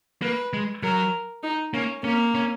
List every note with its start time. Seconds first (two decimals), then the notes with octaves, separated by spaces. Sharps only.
0.22 A#3 B4
0.53 G#3
0.83 F#3 A#4
1.43 D#4
1.74 A#3 C#4
2.04 A#3 C#4
2.35 C#4